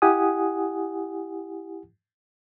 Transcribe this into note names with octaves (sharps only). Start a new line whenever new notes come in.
E4 G4 F#5 G#5 D#6